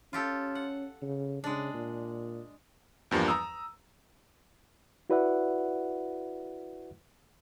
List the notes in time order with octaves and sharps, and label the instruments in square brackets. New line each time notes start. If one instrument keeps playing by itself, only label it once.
[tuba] C#4 [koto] F4 G4 A4
[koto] F#5
[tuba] C#3
[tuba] C#3 [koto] G#3 D4
[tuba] A#2
[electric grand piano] E2 G2 F3 G3 A#3
A#5 D#6 E6
[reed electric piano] E4 F#4 B4 D5 E5 F#5